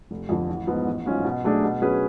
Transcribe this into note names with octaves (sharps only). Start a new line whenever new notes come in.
F1
F2 D3 F3
A1
G#2 F3 B3
A1
G#2 F#3 C#4 F4
B2
F#3 A3 D4 G#4
B2
F#3 C#4 G#4 B4